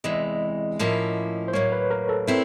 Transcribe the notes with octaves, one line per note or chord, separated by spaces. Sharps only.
E2 C3 E3 G#3 D#5
A2 F3 A#3 C#4 E4
C5
A2 F#3 A#3 C#5
B4
A#4
A4
A3 C4 E4